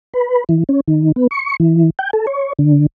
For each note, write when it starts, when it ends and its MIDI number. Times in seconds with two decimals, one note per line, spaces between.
0.14 0.44 71
0.49 0.64 52
0.69 0.80 61
0.88 1.12 51
1.16 1.27 59
1.31 1.56 85
1.60 1.90 52
1.99 2.10 79
2.13 2.26 69
2.27 2.53 73
2.59 2.86 50